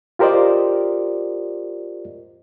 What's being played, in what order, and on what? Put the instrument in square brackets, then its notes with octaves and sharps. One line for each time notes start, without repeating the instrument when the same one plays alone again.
[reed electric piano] F4 G4 A#4 C5 D5 D#5